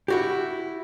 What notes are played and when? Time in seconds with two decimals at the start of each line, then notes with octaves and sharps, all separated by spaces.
0.08 E4 F#4 G4